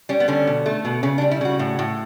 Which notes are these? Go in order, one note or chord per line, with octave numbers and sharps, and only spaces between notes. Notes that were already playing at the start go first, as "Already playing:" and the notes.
G3 C#4
B3
D3 C#4
B2
A3
B2
C#3 C#4
D4
G3
E4
C#3 F#4
A2
A2